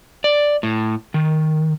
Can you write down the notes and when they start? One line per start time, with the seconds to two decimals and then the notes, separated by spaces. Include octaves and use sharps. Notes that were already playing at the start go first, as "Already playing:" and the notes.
0.24 D5
0.63 A2
1.14 D#3